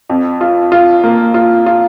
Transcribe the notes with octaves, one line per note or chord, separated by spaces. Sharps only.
F2
F4
F4
A#3
F4
F4